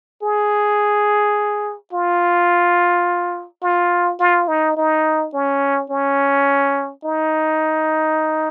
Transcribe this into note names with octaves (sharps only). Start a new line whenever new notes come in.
G#4
F4
F4
F4
D#4
D#4
C#4
C#4
D#4